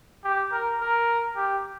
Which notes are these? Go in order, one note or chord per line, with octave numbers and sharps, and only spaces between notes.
G4
A#4
A#4
G4